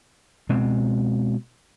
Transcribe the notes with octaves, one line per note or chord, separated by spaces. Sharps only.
B2 G#3 C4